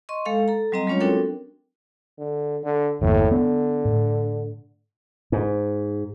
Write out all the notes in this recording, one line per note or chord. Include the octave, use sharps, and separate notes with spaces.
D#5 C6 C#6
G#3 A4 F5
A4 A#5
F#3 G3 C4 D#5 A#5
F#3 G#3 C#4 F4 C#5
C4 D4 F#4 A4 A#4 G5
D3
D3
G1 E2 A2 A#3
D3 B3
A2
G#2